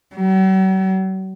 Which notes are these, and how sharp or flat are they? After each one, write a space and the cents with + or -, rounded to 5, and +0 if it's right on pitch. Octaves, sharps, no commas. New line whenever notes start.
F#3 +45